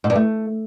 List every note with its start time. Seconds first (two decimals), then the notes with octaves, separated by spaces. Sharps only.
0.04 G#2
0.10 G2
0.16 A3